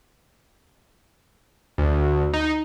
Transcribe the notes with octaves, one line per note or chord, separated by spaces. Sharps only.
D2
D#4